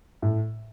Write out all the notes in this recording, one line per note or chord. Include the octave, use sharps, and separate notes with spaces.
A2